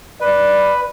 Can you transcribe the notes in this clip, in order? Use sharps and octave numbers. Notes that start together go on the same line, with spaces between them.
B4 D5